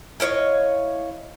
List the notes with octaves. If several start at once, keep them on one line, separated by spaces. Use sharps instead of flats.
E4 F4 C#5 D#5